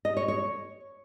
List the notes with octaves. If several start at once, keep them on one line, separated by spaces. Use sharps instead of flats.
D#5
C#5
C#5